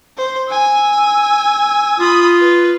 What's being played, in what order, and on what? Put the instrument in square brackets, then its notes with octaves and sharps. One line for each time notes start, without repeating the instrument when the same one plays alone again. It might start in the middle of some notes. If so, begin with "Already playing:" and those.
[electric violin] C5
G#5 E6
[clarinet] F4 [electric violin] B5 D#6
[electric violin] B4